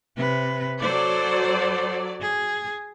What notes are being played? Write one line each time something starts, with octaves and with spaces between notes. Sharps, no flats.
C3 B4
F#3 A4 C5 D5
G#4